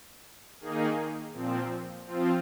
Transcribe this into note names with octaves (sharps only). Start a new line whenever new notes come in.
D#3 A#3 D#4 G#4
A#2 F3 C4
F3 C4 F4